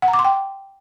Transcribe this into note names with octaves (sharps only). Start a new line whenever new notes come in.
F#5
A#5
D6
C6
G5